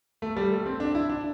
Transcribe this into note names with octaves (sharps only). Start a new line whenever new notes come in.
A3
G3
A3
C4
D4
E4
D4